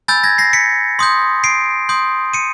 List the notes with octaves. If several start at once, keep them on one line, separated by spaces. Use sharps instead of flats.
G#5 B5 E6 G6 A6
G#6 A#6
A#6 C7
B6 C#7
C6 D#6 G6
C7 D7
C6 D#6 G6
C#7 D#7